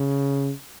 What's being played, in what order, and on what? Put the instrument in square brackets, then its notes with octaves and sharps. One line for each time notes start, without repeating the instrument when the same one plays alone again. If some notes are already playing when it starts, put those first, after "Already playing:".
Already playing: [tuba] C#3